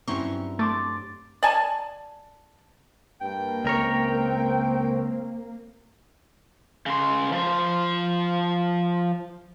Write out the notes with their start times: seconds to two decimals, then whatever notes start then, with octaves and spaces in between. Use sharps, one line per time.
0.08 G2 F#3 C4 C#4 E4 A#5 C6 C#6
0.59 A3 C6 D6 A6
1.43 D5 G#5 A5
3.21 G2 A#3 G5
3.65 C#2 C4 A#4 C#5
6.86 C#3 C6
7.32 F3 C5